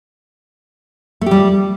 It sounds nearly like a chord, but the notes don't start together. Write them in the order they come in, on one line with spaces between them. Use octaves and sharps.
A3 G4 G3